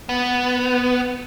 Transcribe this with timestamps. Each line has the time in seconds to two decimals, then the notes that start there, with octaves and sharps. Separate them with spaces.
0.09 B3